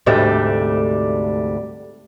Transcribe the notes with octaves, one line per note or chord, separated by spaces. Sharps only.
D2 G#2 C3 G3 A3 D4